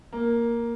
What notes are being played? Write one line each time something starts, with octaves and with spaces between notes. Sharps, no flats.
A#3